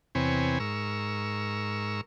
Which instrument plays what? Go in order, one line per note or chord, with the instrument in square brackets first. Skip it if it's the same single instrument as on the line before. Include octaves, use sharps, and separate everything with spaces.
[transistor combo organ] E2 C3 C4 B4 C#5 G#5
G#2 A#4 C#6 E6